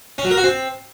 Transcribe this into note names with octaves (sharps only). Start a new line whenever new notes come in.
C#4
F#3
A#4
F#4
C4